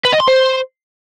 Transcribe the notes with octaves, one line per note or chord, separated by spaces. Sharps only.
B4
D#5
C6
C5